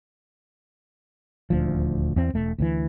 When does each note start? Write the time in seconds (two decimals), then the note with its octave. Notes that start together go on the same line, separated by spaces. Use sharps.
1.50 D#1 D2 F3
2.16 E2 C4
2.34 E1 A3
2.59 D2 C3 E3